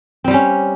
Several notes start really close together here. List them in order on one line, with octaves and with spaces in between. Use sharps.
C4 G3 G4 C#4